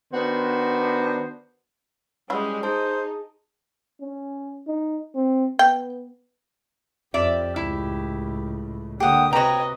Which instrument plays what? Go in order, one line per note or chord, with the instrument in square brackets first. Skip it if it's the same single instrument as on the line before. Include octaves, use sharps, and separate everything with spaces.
[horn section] D#3 B3 D4 F#4 C5
[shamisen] E3 F#4 B5 [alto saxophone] G3 [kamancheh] G#3 C#4 [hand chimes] C#5
[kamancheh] D#4 [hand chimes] G#4 A5 [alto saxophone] C5
[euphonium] C#4
D#4
C4
[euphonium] B3 [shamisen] G5
[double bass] F2 [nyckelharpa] G4 [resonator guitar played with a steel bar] D5 E5
[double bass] C#2 A2 [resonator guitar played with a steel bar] E4
[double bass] D3 [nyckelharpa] A#3 D#6 [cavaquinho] G4 F#5
[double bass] C3 [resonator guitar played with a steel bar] F#4 A#5 [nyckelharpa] B4 D#5 [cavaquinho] C#5 G5